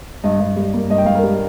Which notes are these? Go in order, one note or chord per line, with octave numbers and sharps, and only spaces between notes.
G2 D#5
G2
G3
A#3
G2 D#5
G5
G2 F5
A#4
G3